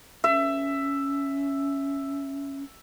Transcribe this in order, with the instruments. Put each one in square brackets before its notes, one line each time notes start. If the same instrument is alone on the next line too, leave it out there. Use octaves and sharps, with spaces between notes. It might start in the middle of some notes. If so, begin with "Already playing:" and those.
[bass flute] C#4 [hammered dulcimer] E5